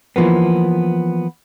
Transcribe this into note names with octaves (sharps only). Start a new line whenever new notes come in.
E3 F3 A#3 B3